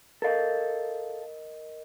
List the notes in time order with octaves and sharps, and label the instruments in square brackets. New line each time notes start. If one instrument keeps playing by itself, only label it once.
[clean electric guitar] A4 F5 [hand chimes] A#4 D#5